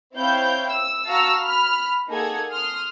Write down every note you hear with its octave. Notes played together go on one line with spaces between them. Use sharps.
C4 E4 C#5 F5 G5 G6
E6
F#4 F5 A5 A#5 E6 F6
B5 F6
A#3 D#4 G#4 A4 F#5 G#6
C6 D#6 F6